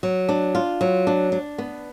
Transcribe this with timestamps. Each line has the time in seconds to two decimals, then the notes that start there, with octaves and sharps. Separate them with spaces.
0.03 F#3
0.29 D4
0.55 F4
0.81 F#3
1.07 D4
1.32 D4
1.58 B3